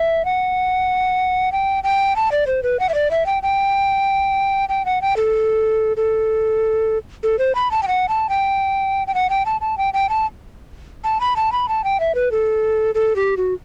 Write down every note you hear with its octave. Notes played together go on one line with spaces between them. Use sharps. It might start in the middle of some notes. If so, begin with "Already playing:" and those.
Already playing: E5
F#5
G5
G5
A5
D5
C5
B4
F#5
E5
D5
E5
G5
G5
G5
F#5
G5
A4
A4
A4
C5
B5
A5
G5
F#5
A5
G5
G5
F#5
G5
A5
A5
G5
G5
A5
A5
B5
A5
B5
A5
G5
E5
B4
A4
A4
G4
F#4